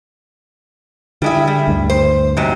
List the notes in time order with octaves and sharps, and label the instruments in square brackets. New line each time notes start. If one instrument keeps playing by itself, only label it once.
[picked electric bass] D3 [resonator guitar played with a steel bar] G3 G#3 E4
[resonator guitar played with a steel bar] G3
[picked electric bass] D2 G2
[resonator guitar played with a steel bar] C5
G#2 C3 F#3